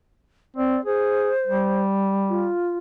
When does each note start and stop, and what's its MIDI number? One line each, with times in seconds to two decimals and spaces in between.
0.57 0.79 60
0.57 0.81 74
0.86 1.32 68
0.86 1.83 72
1.48 2.51 55
2.29 2.78 65